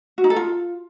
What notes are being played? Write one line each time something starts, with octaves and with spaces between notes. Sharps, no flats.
F#4
D#4
A4
F4